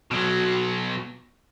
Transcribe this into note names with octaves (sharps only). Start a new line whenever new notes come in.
B2 F#3